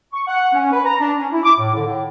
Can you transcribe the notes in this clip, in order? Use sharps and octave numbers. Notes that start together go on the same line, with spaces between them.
C#6
F#5
C#4
B4
A#5
D4
C#4
E4
D6
A2
D3
A2